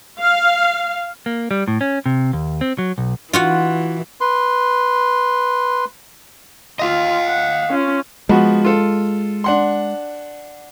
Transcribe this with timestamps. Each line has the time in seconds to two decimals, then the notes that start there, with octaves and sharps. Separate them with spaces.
0.20 F5
1.26 A#3
1.51 G3
1.68 A2
1.81 C#4
2.06 C3
2.33 D#2
2.61 C4
2.78 F#3
2.98 B1
3.33 E3 F4 F#4 F#5
4.21 B4 C6
6.79 F4 D#5 F5
7.27 F#5
7.71 C#4 F4
8.29 F3 G#3 B3 F#4
8.65 F4 A4
9.44 D4 F#5 C6